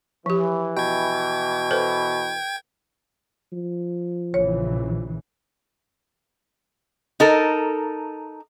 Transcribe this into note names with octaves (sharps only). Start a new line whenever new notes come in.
E3 F3 G4
B2 G5 G#6
A4 B4 C5
F3
A#1 C#3 E3 C#5
D#4 A4 A#4